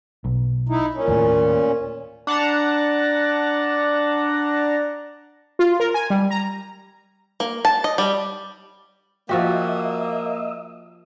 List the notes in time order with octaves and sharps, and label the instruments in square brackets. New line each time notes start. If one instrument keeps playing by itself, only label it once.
[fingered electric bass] B1
[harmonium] D#4 E4
A#2 C#4
[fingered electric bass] D#2 A2
[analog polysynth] D4 F#5 A5 A#5
[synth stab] F4
A#4
G#5
G3
A#5
[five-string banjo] A#3
A5
D#5
G3
[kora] F3 F#4 G4 [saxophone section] A#3 [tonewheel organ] D#5 E5